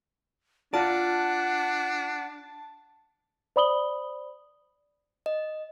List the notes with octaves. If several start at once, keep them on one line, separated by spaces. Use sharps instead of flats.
D4 F4 D5 F#5 A5
C5 D5 B5 D#6 F#7 G7
D#5